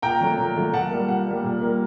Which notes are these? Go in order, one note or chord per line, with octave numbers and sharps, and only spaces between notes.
A#2 G5 A#5
F#3 A3
A#2
F#3 A3
A#2 F#5 A5
G3 A#3
A#2 F#5
G3 A#3
A#2
G3 A#3